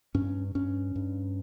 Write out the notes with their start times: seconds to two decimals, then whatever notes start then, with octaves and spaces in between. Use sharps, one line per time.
0.15 G2 C#4
0.55 G2 C#4
0.96 G2